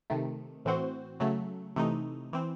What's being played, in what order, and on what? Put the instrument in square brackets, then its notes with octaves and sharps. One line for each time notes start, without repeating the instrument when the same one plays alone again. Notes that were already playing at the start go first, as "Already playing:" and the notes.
[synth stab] C3 D#3 A3
A2 E3 C4 F#4 C5
C#3 F#3 A3
C3 E3 A3 D#4
E3 C4